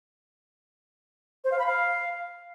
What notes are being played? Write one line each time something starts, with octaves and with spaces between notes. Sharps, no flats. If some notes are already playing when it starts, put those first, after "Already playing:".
C5
F5
B5
F5